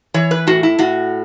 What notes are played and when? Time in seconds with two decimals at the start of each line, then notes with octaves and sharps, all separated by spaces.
0.14 E3 C#5
0.31 B4
0.47 A2 F#4
0.63 E4
0.79 A2 F#4